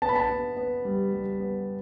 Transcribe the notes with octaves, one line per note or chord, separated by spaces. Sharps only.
B3 A5
B5
A5
B3
B3
G3
G3
B3